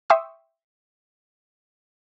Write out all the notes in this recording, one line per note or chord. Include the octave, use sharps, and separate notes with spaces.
E5 G5 C6 C#6 D#6 E6